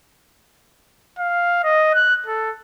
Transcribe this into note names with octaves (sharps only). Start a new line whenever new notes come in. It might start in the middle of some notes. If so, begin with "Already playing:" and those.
F5
D#5
F#6
A4